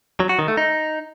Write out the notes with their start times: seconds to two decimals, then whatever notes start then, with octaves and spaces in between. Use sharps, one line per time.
0.20 F#3
0.29 F#4
0.39 D#3
0.48 A3
0.57 D#4